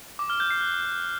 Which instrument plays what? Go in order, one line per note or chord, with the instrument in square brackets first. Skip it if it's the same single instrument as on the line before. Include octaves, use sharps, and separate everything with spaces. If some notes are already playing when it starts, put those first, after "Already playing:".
[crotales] D6
F6
G6
C7
F#6